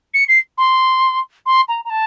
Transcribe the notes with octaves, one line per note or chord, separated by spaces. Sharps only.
C#7
C7
C6
C6
A#5
A#5
A5